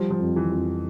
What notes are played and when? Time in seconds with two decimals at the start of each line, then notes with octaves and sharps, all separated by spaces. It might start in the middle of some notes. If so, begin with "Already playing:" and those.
Already playing: F3 G3
0.11 F3
0.20 F2
0.36 E3
0.52 F2